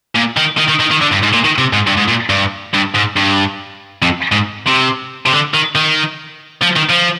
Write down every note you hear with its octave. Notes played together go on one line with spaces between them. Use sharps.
A#2
D#3
D#3
D#3
D#3
D#3
D3
G2
G#2
A#2
D#3
C3
G#2
G2
G#2
A#2
G2
G2
G#2
G2
F2
G#2
C3
C3
D3
D#3
D#3
F3
D#3
F3